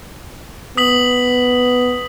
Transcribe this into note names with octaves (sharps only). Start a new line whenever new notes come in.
B3 D#6 B6 F#7